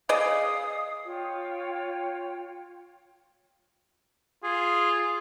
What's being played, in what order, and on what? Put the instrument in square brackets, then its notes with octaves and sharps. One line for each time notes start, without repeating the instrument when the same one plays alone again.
[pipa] G#4 D5 D#5 [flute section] F5 D#6
[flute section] F4 C#5 G5
[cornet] F4 [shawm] G#4